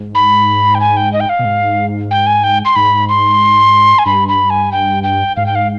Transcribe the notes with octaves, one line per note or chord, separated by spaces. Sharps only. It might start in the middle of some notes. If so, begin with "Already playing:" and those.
Already playing: G#2
B5
G5
G#5
G5
D#5
G5
F5
B2
G#2
G5
G#5
G5
C6
G#2 B5
C6
G#5
G2 B5
B5
G#5
G5
G5
G#2 F5
G5
F5